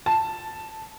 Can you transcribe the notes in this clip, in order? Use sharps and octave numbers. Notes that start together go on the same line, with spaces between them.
A5